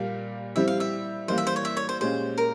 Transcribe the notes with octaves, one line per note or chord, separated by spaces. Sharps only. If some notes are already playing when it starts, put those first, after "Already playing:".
Already playing: A#2 G3 A#3 F5
G3 C4 E4 G4 E5
F5
E5
E3 G3 A#3 C5
E5
C5
C#5
E5
C#5
C5
A#2 G#3 C#4 G4 C5
A#4